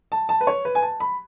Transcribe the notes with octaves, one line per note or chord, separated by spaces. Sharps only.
A5
A5
B4
C#5
B4
G#5
A5
B5